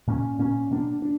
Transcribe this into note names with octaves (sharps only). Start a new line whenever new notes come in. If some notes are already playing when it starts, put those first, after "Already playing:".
A#2 A#3 C#4
A#2 A#3 C#4
B2 A#3 D4
D4